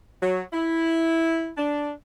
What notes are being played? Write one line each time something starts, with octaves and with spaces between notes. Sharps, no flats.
F#3
E4
D4